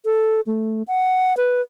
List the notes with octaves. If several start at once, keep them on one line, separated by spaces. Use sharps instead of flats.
A4
A3
F#5
B4